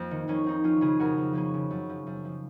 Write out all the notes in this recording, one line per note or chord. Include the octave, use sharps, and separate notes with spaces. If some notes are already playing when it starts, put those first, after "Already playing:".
Already playing: F2 A#3 C4
D#3
F2 A#3 C#4
F2 C4 D#4
F3 C#4 F4
C#3 F4 G#4
F2 F#4 A#4
F2
F3 A#3 C#4
C#3
F#2
F3
F#2
F3